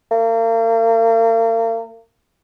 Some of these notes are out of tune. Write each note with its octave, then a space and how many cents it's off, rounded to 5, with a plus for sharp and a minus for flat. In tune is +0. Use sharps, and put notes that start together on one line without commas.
A#3 -40